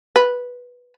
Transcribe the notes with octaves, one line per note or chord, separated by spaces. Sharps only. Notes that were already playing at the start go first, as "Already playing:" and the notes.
B4